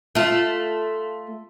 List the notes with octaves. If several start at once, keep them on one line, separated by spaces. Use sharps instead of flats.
A3 F4